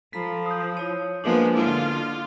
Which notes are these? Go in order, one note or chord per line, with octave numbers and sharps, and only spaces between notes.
F3 A4 A#5 B5 B6
D#6 G6
E4 C#5 D#7
F3 G#3 A#3 B3 D4 D6
D3 F4